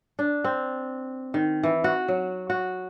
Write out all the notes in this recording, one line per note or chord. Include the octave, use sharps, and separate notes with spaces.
D4
C4
D#3
E3
F#4
F#3
F#4